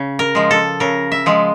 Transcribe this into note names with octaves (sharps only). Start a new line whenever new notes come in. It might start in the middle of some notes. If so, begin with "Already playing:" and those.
Already playing: C#3
A#4
F3 G#3
A4
C#3 A#4
E5
F3 G#3